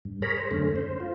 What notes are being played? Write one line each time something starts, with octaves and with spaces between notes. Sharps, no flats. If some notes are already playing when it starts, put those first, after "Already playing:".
G2
G#4 A#4 C#5 A#5 B5
C5
F#2 D3 A3 C#4
C5
F4